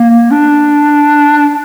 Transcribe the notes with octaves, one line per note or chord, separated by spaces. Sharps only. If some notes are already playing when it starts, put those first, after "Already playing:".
Already playing: A#3
D4